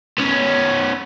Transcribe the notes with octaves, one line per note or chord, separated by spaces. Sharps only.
B3 C#4